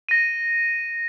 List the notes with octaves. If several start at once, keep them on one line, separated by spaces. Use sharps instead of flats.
A#6 D#7